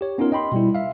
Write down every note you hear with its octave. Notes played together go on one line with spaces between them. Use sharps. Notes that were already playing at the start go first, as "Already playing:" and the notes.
G4 C#5
B3 C#4 D#4 F4 A#4
D#5 G5 B5 C6
B2 G3 E4
E5 F5